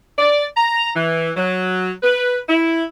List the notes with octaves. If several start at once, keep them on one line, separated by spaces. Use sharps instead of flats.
D5
A#5
E3
F#3
B4
E4